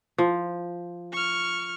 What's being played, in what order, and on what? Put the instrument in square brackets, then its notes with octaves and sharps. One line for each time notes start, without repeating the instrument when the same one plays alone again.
[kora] F3
[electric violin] C#6 F6